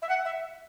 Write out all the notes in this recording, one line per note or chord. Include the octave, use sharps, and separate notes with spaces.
E5
F#5
E5